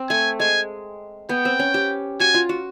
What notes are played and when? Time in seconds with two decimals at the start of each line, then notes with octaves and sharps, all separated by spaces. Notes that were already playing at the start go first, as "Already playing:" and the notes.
Already playing: C4
0.09 A3 G#5
0.40 G#3 G#5
1.29 B3 G5
1.45 C4
1.59 C#4
1.74 G4
2.20 F#4 G#5
2.34 F4
2.49 F#4